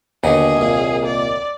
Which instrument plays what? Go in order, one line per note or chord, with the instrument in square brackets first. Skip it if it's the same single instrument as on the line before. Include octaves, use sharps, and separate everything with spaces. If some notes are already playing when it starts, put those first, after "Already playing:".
[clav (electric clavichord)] D#2 [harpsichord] B2 D3 B4 [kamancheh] G#4
[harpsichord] C2 A#2
[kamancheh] D5